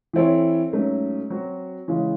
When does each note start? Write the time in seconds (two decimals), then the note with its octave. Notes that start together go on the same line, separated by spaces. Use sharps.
0.13 E3 C4 E4 A4 C#5
0.72 G#2 F#3 A3 C#4
1.30 F#3 C4 F#4
1.88 C#3 E3 G#3 C#4